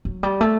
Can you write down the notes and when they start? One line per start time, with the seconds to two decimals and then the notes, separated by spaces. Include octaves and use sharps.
0.05 F#3
0.23 G3
0.41 A3